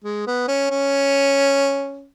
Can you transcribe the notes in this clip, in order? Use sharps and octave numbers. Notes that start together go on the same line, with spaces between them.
G#3
B3
C#4
C#4